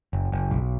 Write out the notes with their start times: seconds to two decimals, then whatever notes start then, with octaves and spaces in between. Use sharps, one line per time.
0.13 F#1
0.32 F#1
0.51 B1